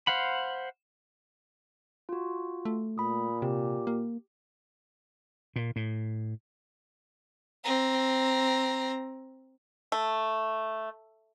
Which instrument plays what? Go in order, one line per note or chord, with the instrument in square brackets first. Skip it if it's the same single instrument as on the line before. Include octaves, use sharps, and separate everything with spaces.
[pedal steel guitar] C5 F5 F#5 B5
[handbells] F4 F#4
[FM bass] A3
[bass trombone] A#2 [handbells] B5 D#6
[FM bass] C3 [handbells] G4
[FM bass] A#3
[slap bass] A#2
A2
[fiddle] C4 A#5
[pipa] A3